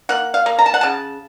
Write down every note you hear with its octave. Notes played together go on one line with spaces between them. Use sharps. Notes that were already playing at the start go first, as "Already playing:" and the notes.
A#3 F#5
F5
A#3
A#5
A5
F#5
C#3 A5